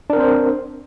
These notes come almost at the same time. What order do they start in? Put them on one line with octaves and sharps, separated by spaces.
D4 A#4 C4 C5